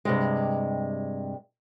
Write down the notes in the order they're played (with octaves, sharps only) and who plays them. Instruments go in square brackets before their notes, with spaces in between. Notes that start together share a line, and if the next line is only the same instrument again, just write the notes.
[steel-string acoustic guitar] G2 C3 G#3